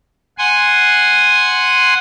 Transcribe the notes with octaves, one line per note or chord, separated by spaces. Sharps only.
F#5 G#5 C6